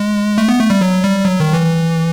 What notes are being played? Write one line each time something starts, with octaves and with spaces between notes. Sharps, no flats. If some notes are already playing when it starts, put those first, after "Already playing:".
Already playing: G#3
A3
B3
A3
G3
F#3
G3
F#3
D#3
E3